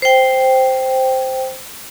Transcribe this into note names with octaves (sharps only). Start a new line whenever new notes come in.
C5 G5